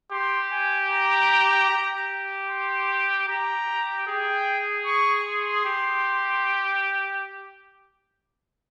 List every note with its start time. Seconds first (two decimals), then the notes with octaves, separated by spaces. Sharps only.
0.12 G4 C6
0.52 G#5
0.91 A#5
1.70 G4
2.48 C6
3.28 G4 A#5
4.07 G#4 G5
4.86 C#6
5.26 C6
5.65 G4